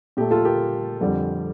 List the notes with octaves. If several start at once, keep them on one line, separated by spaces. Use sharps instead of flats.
A#2 A3 G4
F4 A4
G4 A#4
F2 D3 G3